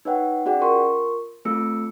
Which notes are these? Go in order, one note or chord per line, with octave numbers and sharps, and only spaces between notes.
D#4 B4 C#5 F#5 G5
C#4 F#4 G#4 D5 F#5 G5
F4 A#4 C6 C#6
A3 C4 F4 A4 E6 C#7